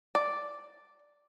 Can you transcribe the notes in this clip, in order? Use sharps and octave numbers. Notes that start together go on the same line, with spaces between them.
D5